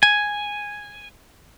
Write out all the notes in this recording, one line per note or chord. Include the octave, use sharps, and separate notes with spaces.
G#5